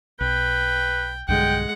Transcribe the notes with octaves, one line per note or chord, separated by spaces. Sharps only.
B1 B4 G5
B1 G2 D3 G#3 F#5 G5